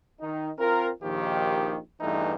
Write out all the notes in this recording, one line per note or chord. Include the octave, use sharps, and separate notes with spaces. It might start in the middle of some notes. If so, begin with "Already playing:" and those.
D#3 D#4
C4 F4 A#4
A#1 D#2 D#3 F3 G4
E2 G2 E3 A3 D#4